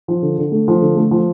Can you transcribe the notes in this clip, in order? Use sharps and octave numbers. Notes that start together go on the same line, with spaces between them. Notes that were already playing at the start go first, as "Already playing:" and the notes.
F3
D3
D3
A3
F3
D3
A3
F3